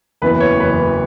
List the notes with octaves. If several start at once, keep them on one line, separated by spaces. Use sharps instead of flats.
F#1 E2 E3 B3 B4
C#5
F#1 E2 E3 B3 B4